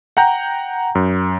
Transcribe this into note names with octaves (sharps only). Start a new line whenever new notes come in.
F#5 G5 A#5 G6
F#2